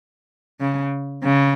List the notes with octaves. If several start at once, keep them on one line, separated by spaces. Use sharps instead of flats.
C#3
C#3